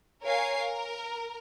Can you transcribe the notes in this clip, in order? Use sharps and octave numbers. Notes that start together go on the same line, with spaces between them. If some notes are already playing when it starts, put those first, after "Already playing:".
A#4 C#5 F5 G#5 C7
A#4